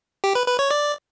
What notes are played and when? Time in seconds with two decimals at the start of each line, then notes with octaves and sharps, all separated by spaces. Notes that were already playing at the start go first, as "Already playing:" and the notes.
0.24 G4
0.35 B4
0.47 B4
0.59 C#5
0.71 D5